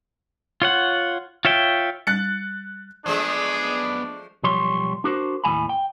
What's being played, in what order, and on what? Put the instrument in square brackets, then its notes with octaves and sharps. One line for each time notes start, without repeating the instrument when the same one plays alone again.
[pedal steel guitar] F4 C#5 F#5
F4 C#5 E5 G5
[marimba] G3 [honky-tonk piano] F#6 A6 C#7
[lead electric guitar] F#2 B3 [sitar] F3 G#3 A3 [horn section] D4 [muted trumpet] G#4
[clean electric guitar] B1 F3 G3 C#5 C6
D4 F#4 A#4 C5
D#2 A2 F#3 G#5 B5
G5